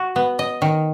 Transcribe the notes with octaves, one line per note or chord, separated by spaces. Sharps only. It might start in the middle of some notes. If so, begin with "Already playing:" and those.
Already playing: F#4
B3
D#5
D#3